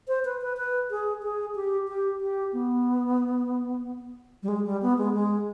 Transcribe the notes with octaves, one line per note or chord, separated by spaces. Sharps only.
C5
B4
B4
B4
G#4
G#4
G4
G4
G4
B3
G3
G#3
G3
B3
G#3
G#3